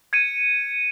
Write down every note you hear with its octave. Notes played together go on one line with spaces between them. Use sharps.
G#6 C#7 D#7